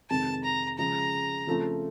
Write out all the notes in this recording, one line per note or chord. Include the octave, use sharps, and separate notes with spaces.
F2 C3 D#3 G#3 C4 A5
A#5
C#3 F3 G#3 A#5
C#3 F3 A3 C4 F4